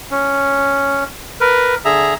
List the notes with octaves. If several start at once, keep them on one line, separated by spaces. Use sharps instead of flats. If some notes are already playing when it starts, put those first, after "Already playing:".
C#4
A#4 B4
D3 G#4 E5 A#5